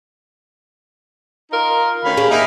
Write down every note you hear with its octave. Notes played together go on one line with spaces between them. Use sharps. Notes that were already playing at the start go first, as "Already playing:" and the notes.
D#4 F4 A#4
D2 D#3 C#4 F5 B5
C#4 G4 G#4
A#3 D#4 E5